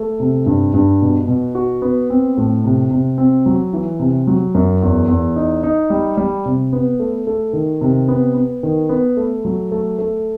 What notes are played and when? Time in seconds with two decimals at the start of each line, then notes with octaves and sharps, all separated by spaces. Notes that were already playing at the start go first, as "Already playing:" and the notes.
Already playing: A3
0.20 C3
0.46 G2
0.74 G2
1.01 B2
1.28 B2
1.55 F#4
1.82 B3
2.10 C4
2.37 A2
2.64 C3
2.91 C3
3.18 C4
3.46 F#3
3.73 E3
3.99 C3
4.27 F#3
4.55 F#2
4.82 E2
5.08 E2
5.36 D#4
5.63 D#4
5.90 G3
6.17 G3
6.45 C3
6.73 B3
6.99 A3
7.27 A3
7.53 D#3
7.81 C3
8.08 B3
8.35 B3
8.63 D#3
8.89 B3
9.17 A3
9.45 F#3
9.71 A3
9.98 A3